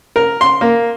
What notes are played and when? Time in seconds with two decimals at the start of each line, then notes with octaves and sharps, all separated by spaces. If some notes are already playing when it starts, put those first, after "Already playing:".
0.16 A#4
0.41 C6
0.61 A#3